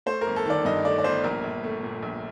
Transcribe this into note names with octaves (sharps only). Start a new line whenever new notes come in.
A3 C5
A#4
G1
A4
D#3 D5
G2 D#5
A3 D5
D5
G1 C5
A#1 A#4
A#1
A3
A#2
A#1